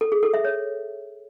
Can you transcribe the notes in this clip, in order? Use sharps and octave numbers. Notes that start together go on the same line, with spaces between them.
A4
G#4
A4
E5
C#5